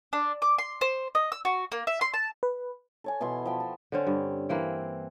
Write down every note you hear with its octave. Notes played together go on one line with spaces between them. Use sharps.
D4
D6
C6
C5
D#5
E6
F#4
A#3
E5
C6
A5
B4
A4 C#5 G#5
B2 E3 E4 C6
F3 G5 C6
A4
D3 C4 C#4
G2
E3 A#3 C4